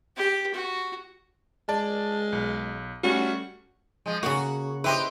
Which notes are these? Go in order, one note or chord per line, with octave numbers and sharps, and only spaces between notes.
G4
F#4
G#3 D5 A5
B1
G3 A3 C#4 F#4
F3 G#3
C#3 A#3 F#4
E4 G4 B4 C5 D#5